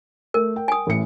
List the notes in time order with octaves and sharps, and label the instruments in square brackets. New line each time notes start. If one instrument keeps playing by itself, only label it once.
[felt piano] A3 [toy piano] A#4
[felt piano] G5
[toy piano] G#5 D#6
[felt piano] A1 A2 C#7